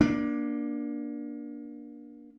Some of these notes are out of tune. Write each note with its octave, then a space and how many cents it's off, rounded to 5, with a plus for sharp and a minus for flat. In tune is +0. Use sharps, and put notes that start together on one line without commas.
A#3 +30 D4 +0